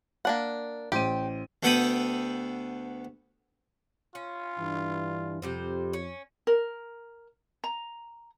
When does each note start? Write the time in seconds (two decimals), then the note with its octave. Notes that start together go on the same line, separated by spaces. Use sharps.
0.25 A#3 D4 F#5
0.92 A1 G4 C5 D#7
1.63 D2 B3 A4 G5 B5 D#6
4.15 C#4 F4
4.59 G2 E3 D4
5.42 F2 C3 G3 C5
5.93 C#4
6.47 A#4
7.64 A#5